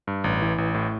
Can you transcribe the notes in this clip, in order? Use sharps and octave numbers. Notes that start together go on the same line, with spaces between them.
G2
A1
E3
A1
A2